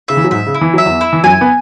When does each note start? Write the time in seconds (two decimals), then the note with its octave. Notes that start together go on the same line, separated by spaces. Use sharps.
0.08 C#3 E5
0.17 E3
0.24 F#3
0.31 G#2 G#3 E5
0.46 C#3
0.54 E4
0.61 E3
0.74 F#3 E5
0.86 E2 E3
1.01 E4
1.13 E3
1.24 F#2 F#3 G#5
1.41 B3